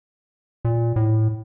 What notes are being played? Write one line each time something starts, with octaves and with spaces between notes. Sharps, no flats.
A#2
A2